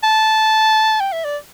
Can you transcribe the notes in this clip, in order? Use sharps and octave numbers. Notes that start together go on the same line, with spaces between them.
A5
G5
E5
D5